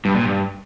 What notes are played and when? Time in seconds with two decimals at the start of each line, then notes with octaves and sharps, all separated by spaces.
0.05 G2
0.15 A#2
0.25 G2